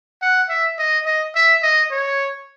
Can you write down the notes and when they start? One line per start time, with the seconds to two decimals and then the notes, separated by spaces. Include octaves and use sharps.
0.22 F#5
0.49 E5
0.78 D#5
1.06 D#5
1.35 E5
1.63 D#5
1.91 C#5